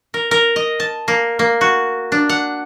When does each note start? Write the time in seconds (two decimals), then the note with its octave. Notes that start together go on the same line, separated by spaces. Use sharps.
0.14 A#4
0.31 A#4
0.56 D#5
0.80 A5
1.08 A#3
1.39 A#3
1.61 F#4
2.12 D4
2.29 F#5